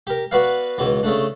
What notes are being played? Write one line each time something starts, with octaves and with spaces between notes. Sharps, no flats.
G4 A#4
B3 F#4 B4 D5 F5
C#2 B2 E3
C#3 A3 D4